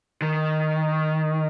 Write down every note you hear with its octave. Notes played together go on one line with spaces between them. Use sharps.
D#3